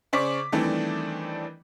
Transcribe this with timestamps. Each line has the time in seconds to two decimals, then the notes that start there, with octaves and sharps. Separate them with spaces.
0.13 C#3 C5 D5 C#6 D6 B6
0.52 D#3 E3 G3 A3 C4 D4